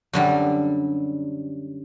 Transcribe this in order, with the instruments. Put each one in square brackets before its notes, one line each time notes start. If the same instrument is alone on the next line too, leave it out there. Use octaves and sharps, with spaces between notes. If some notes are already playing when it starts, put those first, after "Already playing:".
[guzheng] F#2 D3 G3